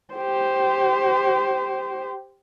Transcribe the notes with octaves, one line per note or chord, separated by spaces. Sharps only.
G4 C5